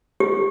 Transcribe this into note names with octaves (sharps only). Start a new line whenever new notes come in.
G4